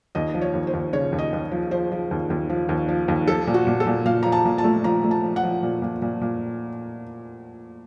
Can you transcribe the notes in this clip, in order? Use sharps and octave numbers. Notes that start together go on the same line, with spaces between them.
D#2 D#5
F3
C#5
D#2
C5
D#2
C#3 C#5
D#2
D#5
D#2
F3
F3 C5
F3
D#2
D#2
F3
D#2
F3
D#2
F3 A4
A#2
F#4
A#2
A4
A#2
A#2 F5
F3 A#5
A5
A#2
A5
A3
F3 A#5
A3
A5
F3
F#5
F3
A#2
A#2
A#2
A#2